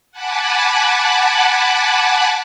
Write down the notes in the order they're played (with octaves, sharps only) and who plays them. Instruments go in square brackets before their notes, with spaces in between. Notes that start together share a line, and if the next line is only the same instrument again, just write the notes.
[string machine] F#5 G#5 A5 B5 D6